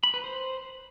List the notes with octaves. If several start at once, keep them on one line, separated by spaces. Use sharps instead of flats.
B5
B4
C5